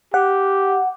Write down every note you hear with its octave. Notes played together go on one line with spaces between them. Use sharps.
G4 F#5